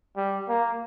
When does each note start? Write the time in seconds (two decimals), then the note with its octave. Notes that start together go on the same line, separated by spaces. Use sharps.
0.17 G3
0.49 A#3